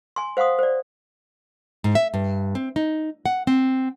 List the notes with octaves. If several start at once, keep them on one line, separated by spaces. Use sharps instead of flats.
G#5 C6
C5 F5 F#5 C6 D#6
C5 D5
G#2
E5
G2
C4
D#4
F#5
C4